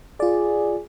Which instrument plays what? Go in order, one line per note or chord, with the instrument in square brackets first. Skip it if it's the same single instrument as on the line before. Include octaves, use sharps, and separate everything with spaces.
[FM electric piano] F4 D5 [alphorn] G#4